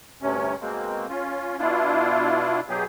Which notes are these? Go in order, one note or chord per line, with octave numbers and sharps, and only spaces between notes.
D2 G2 C3 C#4
B2 G#3 A#3 C4
C#4 F4
B2 D4 E4 F4
B2 F#3 B3 G4 G#4